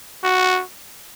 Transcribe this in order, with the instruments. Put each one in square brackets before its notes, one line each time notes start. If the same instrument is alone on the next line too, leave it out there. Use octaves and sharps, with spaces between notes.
[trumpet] F#4